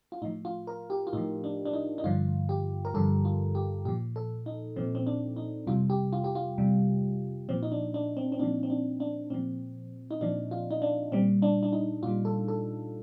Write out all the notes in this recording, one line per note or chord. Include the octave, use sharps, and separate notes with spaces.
F4
A2 F3 D#4
F4
A#4
G4
F4
A2 F3 D#4
D4
D4
D#4
D#4
G2 D3 F3 F4
G4
A#4
G2 D3 F3 A4
F4
G4
A#2 F3 G4
A4
D#4
A#2 F3 C4
C4
D4
D#4
F2 C3 G3 F4
G4
F4
G4
F4
F2 C3 G3
A#2 F3 C4
D#4
D4
D4
C4
C4
A#2 F3 D4
C4
D4
D4
A#2 F3 C4
D#4
A#2 F3 D4
F4
D#4
D4
A#2 G3 C4
D4
D4
D#4
A#2 G3 F4
A4
A4